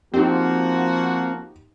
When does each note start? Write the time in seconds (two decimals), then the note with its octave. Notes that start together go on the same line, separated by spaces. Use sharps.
0.14 F3 A#3 C4 D#4 F#4 G4